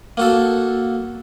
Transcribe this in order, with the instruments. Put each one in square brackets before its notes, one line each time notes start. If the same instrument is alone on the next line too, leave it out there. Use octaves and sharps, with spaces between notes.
[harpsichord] A#3 F#4 A4